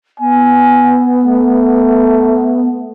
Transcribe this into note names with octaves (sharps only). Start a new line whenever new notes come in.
B3 G#5
A3